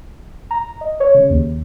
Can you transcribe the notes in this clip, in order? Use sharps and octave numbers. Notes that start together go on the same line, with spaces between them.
A#5
D#5
C#5
C#3
D#2